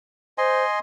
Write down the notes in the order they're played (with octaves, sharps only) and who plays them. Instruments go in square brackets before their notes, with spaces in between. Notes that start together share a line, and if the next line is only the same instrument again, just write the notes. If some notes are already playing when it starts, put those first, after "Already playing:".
[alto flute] C5 [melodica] D#5 G#5 C6